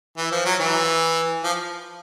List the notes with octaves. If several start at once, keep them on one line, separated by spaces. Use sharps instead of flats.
E3
F3
F#3
E3
F3